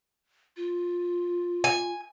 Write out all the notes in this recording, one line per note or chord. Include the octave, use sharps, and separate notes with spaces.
F4
G#5